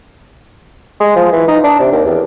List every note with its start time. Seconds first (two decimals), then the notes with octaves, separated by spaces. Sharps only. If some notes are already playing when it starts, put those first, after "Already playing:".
1.00 G#3
1.16 F3
1.32 E3
1.48 D#4
1.64 D4
1.80 C3
1.92 D#2
2.05 E2